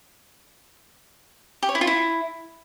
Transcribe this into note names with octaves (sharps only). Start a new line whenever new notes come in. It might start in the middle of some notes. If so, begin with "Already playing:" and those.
G4
C#5
E4
F4
E4